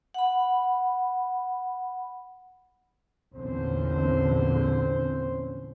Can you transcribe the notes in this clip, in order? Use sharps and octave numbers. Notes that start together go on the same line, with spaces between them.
F#5 B5
A#1 E2 D3 C4 C#4 C5